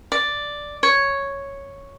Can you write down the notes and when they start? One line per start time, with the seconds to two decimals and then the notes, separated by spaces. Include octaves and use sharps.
0.12 D5
0.83 C#5